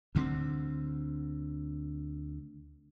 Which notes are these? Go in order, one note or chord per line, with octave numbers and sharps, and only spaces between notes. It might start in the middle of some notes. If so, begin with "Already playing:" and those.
D2 D3 G3 C4